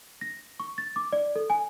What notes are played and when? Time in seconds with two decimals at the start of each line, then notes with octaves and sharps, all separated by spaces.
0.21 A#6
0.60 C#6
0.78 A6
0.96 D6
1.13 D5
1.36 A4
1.50 G#5